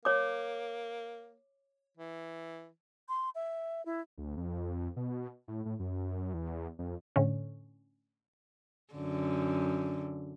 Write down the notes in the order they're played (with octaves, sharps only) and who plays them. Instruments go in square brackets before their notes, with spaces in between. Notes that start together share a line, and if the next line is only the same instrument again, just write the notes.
[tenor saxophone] A#3 [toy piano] C#5 D6
[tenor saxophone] E3
[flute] C6
E5
E4
[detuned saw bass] D2
F2
B2
A2
A2
F#2
E2
F2
[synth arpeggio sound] A2 D3 C#4
[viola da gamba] F#2 D3